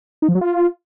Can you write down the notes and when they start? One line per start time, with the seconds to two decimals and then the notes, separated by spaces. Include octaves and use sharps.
0.22 D#4
0.29 F3
0.35 F#3
0.41 F4